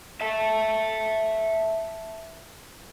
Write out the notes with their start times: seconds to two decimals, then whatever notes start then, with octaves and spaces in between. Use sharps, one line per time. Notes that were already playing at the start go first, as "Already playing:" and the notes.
0.21 E5 A5